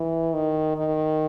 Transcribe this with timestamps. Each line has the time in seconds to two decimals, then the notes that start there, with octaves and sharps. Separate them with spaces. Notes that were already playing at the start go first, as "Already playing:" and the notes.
Already playing: E3
0.34 D#3
0.77 D#3